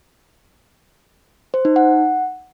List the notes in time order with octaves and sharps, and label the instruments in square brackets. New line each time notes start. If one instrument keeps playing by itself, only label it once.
[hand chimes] C5
D#4
F#5